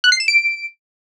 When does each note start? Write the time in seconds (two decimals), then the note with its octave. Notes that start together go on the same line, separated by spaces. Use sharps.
0.04 F#6
0.12 C7
0.20 E7
0.28 D7